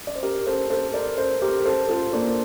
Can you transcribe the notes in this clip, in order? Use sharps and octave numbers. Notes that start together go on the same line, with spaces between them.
D5
C5
G4 A#4
A4 C5
A4 C5
A#4 D5
A4 C5
G4 A#4
A4 C5
F4 A4
A#3 D4